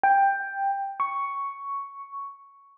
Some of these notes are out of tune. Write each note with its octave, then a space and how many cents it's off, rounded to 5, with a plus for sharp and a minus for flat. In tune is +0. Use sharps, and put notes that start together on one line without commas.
G5 +10
C#6 +5